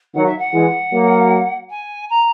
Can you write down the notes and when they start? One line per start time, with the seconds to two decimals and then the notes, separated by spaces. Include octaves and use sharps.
0.14 D#3 F#3 F#5
0.26 E5
0.38 F#5
0.53 E3 G#3
0.92 F#3 A#3
1.70 G#5
2.09 A#5